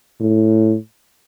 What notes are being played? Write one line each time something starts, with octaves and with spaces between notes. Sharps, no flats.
A2